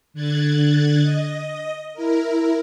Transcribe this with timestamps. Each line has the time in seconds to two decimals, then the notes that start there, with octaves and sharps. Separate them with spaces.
0.14 D3 F#6 G#6 A6
1.01 D#5
1.94 E4 A#4